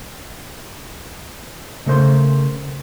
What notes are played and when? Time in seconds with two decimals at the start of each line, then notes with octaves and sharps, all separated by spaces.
1.86 C#3 A3 A#4 C5